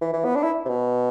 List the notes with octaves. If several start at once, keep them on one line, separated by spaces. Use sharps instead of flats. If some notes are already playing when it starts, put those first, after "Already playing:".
E3
E3
B3
D4
E4
C3
B2